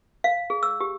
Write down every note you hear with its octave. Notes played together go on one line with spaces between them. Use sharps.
F5
G#4
E6
G4